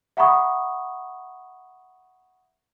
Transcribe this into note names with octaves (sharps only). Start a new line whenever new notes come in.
E5 F#5 A#5 B5 C#6 D#6